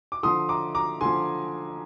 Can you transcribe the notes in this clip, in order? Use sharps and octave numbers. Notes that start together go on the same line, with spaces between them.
D6
D3 F3 C6 D#6
A#5 D6
A#5 D6
D3 F3 G#5 C6